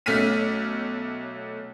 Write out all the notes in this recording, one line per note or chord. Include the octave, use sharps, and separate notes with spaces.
B1 A3 C#4 F6 B6 D#7